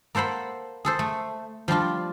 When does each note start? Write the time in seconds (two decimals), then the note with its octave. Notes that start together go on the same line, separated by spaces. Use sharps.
0.15 A#3 A4 C5 F#5 B5
0.85 G#4 A4 C5
0.99 A3
1.68 F3 G3 D4 F4